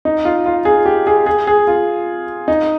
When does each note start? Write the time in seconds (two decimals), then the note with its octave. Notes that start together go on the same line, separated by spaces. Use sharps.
0.05 D#4
0.25 F4
0.46 F4
0.65 G#4
0.86 G4
1.07 G#4
1.26 G#4
1.47 G#4
1.67 F4
2.48 D#4